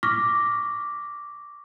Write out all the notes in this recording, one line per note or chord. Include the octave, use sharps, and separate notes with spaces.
C#6 D6 F6 A#6 B6